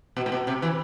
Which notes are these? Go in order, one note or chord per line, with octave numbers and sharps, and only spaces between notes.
B2
A2
B2
C3
E3